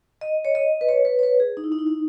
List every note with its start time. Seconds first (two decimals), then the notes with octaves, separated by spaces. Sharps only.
0.21 D#5
0.45 C#5
0.55 D#5
0.81 B4
0.89 C#5
1.05 B4
1.19 C#5
1.23 B4
1.40 G#4
1.57 D#4
1.64 E4
1.72 D#4
1.79 E4
1.87 D#4